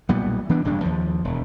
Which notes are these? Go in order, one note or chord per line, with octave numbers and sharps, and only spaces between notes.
B1 A#2 G3 B3
E3 B3 D4
E1 G2 C#3 D4
D#2 F3
E1